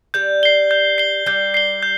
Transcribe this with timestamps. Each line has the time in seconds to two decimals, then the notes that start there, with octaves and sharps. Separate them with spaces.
0.14 G3 G6
0.43 C7 G7
0.71 G6
0.98 C7 G7
1.26 G3 G6
1.54 C7 G7
1.83 G6